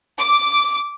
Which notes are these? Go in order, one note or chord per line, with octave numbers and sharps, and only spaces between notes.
D6